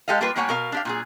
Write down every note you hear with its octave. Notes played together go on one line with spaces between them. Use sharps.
G#3 G4 A4 D#5 F5
G3 A#3 F4 G4 B4
A2 G3 A#3 C#5 F#5 G#5
B2 A#4 F5
D4 G4 F5
A#2 F#3 G#4